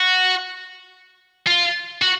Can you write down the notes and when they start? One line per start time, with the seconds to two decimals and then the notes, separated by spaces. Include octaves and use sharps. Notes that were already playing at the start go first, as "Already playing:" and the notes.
Already playing: F#4
1.47 F4
2.02 F#4